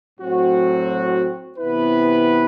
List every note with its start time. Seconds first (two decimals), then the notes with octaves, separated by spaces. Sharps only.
0.20 A2 F#3 C4 F#4
1.58 C3 E3 B3 E4 B4